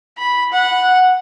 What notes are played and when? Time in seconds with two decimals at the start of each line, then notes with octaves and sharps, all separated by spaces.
0.18 B5
0.52 F#5